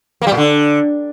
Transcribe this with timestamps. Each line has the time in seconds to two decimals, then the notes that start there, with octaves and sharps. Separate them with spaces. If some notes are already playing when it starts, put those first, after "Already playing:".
0.22 A#3
0.27 G3
0.32 A#2
0.37 D3